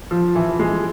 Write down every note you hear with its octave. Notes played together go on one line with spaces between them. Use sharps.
F3
E3
G#3